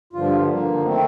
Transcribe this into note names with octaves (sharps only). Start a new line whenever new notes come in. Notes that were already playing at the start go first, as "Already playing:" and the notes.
G2 D3 F3 F4
D3 F3 A#3
D#3 A3 C4 D#4